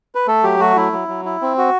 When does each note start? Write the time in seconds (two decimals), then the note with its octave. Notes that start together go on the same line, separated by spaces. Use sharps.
0.15 B4
0.27 A3 A4
0.44 F#3 G4
0.59 A3 F#4
0.76 F#3 E4
0.92 F#3
1.08 F#3
1.25 E4
1.42 C4
1.58 F#4